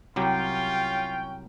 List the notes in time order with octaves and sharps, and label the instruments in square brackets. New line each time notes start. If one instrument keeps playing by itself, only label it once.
[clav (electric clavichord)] C2 F#3 G4 [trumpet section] C#4 C#5 G5 [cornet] F4